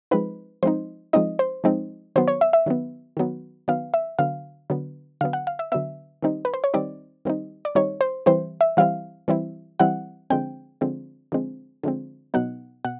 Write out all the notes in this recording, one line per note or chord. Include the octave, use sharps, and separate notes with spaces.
F3 G#3 C4 D#4 B4
F3 G#3 C4 D#4 C5
F3 G#3 C4 D#4 D#5
C5
F3 G#3 C4 D#4
D#3 F#3 B3 C5
C#5
E5
E5
D#3 F#3 B3
D#3 F#3 B3
D#3 F#3 B3 F5
E5
D3 F#3 B3 F5
D3 F#3 B3
D3 F#3 B3 F5
F#5
F5
E5
D3 F#3 B3 E5
D#3 G3 C4 D#4
B4
C5
C#5
D#3 G3 C4 D#4 D5
D#3 G3 C4 D#4
D5
D#3 G3 C4 D#4 C#5
C5
E3 G3 C4 E4 C5
E5
E3 G3 C4 E4 F5
E3 G3 C4 E4
E3 G3 C4 E4 F#5
D3 F3 G#3 C4 G5
D3 F3 G#3 C4
D3 F3 G#3 C4
D3 F3 G#3 C4
B2 F#3 B3 D#4 F#5
B2 F#5